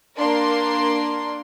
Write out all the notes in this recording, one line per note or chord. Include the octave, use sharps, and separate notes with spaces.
A#3 D4 A#4 C6